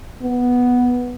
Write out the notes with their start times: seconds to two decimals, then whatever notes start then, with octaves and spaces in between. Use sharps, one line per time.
0.22 B3